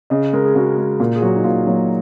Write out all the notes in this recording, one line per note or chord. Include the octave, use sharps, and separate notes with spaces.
C#3 D#5
G#3 A#4
G#4
C#3 F#4
G#3
A#2 F4
G#4
F#3 A#3 F#4
D#4
A#2 F4
F#3 A#3